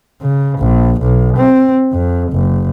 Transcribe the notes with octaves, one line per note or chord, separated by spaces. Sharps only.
C#3
A#1
B1
C4
F2
F#1